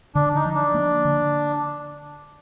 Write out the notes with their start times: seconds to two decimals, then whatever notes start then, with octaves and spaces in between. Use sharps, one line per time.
0.15 D3 D4
0.35 D#4
0.45 F3
0.55 D4
0.74 A#3
1.05 D3